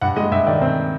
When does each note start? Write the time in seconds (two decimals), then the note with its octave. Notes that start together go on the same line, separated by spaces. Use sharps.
0.01 G2 F#5
0.16 G#3 D#5
0.32 G2 E5
0.47 D#3 D5
0.61 C4